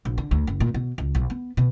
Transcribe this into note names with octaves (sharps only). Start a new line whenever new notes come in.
A#1
D3
D2
F#1
A#2
B2
C#2
B1
B3
B2